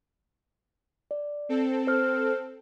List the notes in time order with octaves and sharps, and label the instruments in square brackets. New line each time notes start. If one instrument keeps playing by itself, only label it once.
[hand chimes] D5
[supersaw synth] C4 A4
[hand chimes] C5 F6